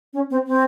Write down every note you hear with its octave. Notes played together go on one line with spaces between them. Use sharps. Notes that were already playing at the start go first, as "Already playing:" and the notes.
C#4
C4
C4